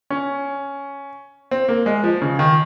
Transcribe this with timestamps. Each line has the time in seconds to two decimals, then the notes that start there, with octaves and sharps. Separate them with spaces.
0.10 C#4
1.51 C4
1.68 A#3
1.86 G#3
2.04 F3
2.22 C#3
2.39 D#3